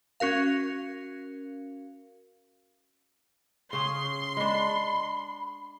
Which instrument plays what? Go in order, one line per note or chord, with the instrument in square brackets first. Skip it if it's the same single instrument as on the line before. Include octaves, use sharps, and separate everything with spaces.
[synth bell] C#4 F#4 A#4 F5
[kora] C#3 C#4 G#4 [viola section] C6
[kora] G#3 D4 [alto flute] B5